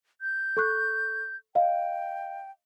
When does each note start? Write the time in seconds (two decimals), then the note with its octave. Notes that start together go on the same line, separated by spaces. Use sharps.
0.21 G6
0.57 A4 C#6 F#6
1.55 D#5 F5 G5